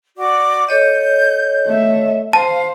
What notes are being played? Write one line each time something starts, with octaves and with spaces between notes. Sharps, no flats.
F#4 D5 D6
A4 C#5 D#5 G6
A3 E5
C5 F5 A5